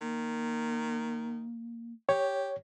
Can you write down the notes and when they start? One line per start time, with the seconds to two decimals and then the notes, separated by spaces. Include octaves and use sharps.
0.01 D#3 A#3
2.09 G4 C#5